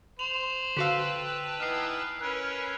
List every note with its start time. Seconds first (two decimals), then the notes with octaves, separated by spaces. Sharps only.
0.19 C5 F7 F#7
0.77 D3 F#4 B4 F5 G5 A5 E6 B6
1.60 E3 B3 D#4 F6 C7
2.21 C#4 A#4 B4 C#5 F#6